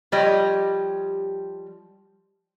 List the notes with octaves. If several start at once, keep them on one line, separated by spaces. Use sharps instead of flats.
F3 G3 G4 C#5 D#5